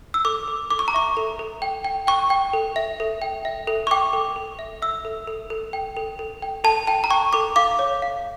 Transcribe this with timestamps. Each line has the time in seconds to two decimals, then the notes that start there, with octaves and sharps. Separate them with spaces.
0.14 E6
0.25 A4 D6
0.48 A4
0.70 A4 D6
0.79 C#6
0.88 A#5
0.94 E5 C#6
1.17 A4
1.39 A4
1.62 G5
1.85 G5
2.07 G5 C#6
2.30 G5
2.53 A4
2.76 E5
3.00 A4
3.22 G5
3.45 E5
3.67 A4
3.87 C#6
3.91 G5 D6
4.13 A4
4.36 A4
4.59 E5
4.82 E5 E6
5.05 A4
5.28 A4
5.50 A4
5.73 G5
5.97 A4
6.19 A4
6.42 G5
6.64 A4 A5
6.87 G5 A5
7.04 A#5
7.11 G5 C#6
7.33 A4 D6
7.56 F5 D6
7.79 C#5
8.02 F5